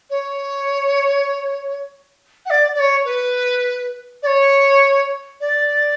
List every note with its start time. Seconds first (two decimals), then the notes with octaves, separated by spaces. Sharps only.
0.10 C#5
2.46 F#5
2.50 D5
2.75 D5
2.79 C#5
3.05 B4
4.22 D5
4.26 C#5
5.40 D5